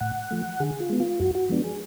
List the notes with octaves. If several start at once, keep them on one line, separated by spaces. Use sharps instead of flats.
A2 F#5
F3 A3
D3 G#4
F4
G#3 B3
F4
F#2 F#4
F#4
F3 G#3 B3 D4
G#4